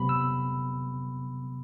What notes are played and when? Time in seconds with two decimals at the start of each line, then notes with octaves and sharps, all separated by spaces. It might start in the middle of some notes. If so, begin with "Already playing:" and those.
Already playing: C3 F#3 B3 B5
0.09 E6